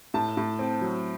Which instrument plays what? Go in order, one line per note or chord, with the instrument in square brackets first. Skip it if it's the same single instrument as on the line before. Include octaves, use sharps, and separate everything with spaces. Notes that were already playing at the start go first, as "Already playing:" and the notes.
[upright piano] A2 A5
A2
C4
F#3